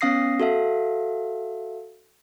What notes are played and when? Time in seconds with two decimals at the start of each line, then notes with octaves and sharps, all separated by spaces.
0.01 B3 C#4 F5 D#6 A#6 C7
0.40 F#4 A4 E5 F5